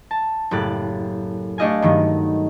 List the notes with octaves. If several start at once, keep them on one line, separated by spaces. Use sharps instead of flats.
A5
F#1 A2 G4 F#6 A6
A3 D4 G4 D#5 F5 G#5
G2 D#3 F#3 B3